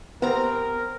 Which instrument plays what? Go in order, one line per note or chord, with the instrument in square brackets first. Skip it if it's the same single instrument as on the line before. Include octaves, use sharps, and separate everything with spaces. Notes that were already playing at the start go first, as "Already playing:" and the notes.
[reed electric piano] B3 G4 B4 [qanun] C4 A#5 [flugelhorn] A#4